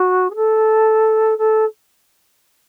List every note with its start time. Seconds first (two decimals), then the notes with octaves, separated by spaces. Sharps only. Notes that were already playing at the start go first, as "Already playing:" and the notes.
Already playing: F#4
0.30 G#4
0.35 A4
1.38 A4